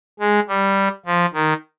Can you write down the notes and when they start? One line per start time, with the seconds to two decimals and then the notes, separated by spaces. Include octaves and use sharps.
0.20 G#3
0.48 G3
1.06 F3
1.33 D#3